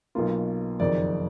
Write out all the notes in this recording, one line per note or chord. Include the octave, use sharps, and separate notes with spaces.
B1 B2 A#3 F4
F#1 F2 D#3 D5